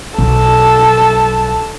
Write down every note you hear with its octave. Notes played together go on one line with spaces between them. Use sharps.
B1 A4 A5